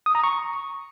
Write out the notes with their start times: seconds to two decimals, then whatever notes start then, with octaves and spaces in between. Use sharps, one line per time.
0.06 D#6
0.15 A#5
0.24 C#6